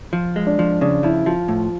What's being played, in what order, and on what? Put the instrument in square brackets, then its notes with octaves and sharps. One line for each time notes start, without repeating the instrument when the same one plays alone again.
[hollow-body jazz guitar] F3
G#3
[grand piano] D4
[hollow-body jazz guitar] F3
[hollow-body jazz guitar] C#3 [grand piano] D4
[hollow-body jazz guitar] F3 [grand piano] E4
[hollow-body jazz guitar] F3 [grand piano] F4
[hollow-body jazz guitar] A2